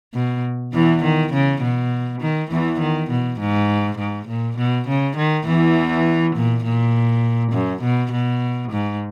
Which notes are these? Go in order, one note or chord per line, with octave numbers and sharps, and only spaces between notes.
B2
E2 E3
D#3
C#3
B2
D#3
E2 E3
D#3
B2
G#2
G#2
A#2
B2
C#3
D#3
E2 E3
A#2
A#2
F#2
B2
B2
G#2